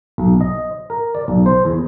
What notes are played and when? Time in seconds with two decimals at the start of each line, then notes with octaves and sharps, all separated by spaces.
0.18 B1
0.41 D#5
0.90 A#4
1.15 D5
1.28 B1
1.46 C5
1.65 E2